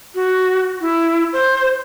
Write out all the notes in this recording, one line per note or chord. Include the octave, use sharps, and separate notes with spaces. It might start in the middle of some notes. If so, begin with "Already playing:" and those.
F#4
E4
C5